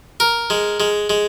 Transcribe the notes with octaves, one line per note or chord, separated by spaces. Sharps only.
A#4
G#3
G#3
G#3